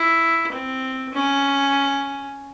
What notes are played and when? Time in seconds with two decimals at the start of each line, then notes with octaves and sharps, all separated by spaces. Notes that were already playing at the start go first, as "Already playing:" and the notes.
Already playing: E4
0.52 C4
1.14 C#4